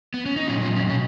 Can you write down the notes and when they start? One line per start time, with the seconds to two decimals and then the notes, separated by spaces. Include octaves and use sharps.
0.14 B3
0.26 C#4
0.36 D#4
0.48 A#2 F#3 B3 C#4 F4
0.61 C#4 F4
0.76 C#4
0.89 B2 C#4